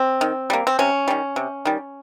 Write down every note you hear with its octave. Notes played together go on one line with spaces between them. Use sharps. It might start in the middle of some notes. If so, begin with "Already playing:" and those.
Already playing: C4
D#3
G3 A#3
C4
C3 C#4
D#3 G3
C3
D#3 G3